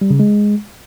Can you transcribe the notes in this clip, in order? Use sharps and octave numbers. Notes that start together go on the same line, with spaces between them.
G3
C#3
G#3